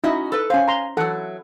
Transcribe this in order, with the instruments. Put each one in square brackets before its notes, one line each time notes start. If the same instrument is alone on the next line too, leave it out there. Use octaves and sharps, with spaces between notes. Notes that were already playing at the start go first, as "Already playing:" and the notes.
[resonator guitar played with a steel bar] C#4 F#4 D#5 [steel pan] D#4 E4
[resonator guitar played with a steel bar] A4 B4
[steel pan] C#4 C5 [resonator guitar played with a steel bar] F5 G#5
[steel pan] A#5 C6
[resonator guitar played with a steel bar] E3 F#3 [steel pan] A4 F#5